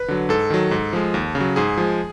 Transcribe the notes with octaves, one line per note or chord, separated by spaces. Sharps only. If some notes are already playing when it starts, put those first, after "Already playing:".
Already playing: B4
D3 F#3
G#2 A4
D#3 F#3
G#2
F3 G#3
D#2
C#3
F#3
G#2 G#4
F3 G#3